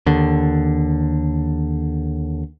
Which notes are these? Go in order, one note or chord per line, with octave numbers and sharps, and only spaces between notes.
D#2 D3